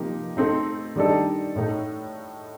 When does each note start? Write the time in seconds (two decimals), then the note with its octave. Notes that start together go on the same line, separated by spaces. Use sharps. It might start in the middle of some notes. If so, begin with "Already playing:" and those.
Already playing: C3 F3 A#3 D#4 G4
0.37 A3 C4 D#4
0.96 D#3 G3 D4 A4 D#5
1.56 A2 A3 D#4